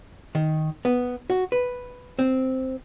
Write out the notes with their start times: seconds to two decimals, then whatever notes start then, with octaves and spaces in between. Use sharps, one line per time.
0.35 D#3
0.85 B3
1.30 F#4
1.52 B4
2.19 C4